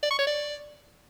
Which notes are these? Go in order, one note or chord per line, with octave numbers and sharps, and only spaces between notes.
D5
C#6
C#5
D5